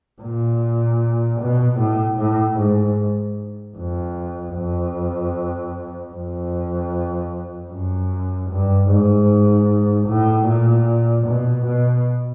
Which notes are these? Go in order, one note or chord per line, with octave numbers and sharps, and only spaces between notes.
A#2
B2
A2
A2
G#2
F2
F2
F2
F#2
G2
G#2
A2
A#2
B2
B2